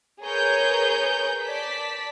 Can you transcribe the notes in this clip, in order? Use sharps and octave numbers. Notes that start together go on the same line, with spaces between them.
G#4 A#4 B4 C#5 A#5 G6
D5 A5 B6